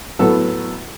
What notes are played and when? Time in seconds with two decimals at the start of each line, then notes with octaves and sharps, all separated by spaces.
0.19 A2 F#3 B3 A4